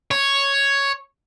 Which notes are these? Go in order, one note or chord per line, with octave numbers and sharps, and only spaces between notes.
C#5